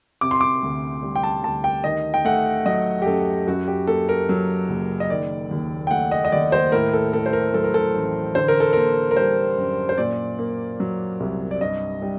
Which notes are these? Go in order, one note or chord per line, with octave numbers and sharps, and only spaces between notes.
C3 D6
C6
D6
D2
G3
G5
A5
D2 A5
G5
D#3 D#5
G5
A3 F#5
F#3 D#5
G4
F#2 A4
F#2 F#4
G4
A#3 A4
A#4
F#3
F#1
D#5
D#3 D5
D#2
G5
A3 F#5
D#5
D#5
D#2 D5
C5
A2 A#4
A4
A3 A4
C5
A#4
F#3 A4
A#4
A4
A1
D3 C5
A#4
A4
A#3 A#4
A#4
G3 C5
F#2
C5
A#2 D5
A#3
F#3
C2
D5
G2 D#5
G3